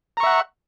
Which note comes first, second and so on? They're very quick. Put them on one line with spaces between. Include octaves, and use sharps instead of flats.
A#5 C#6 E5 F#5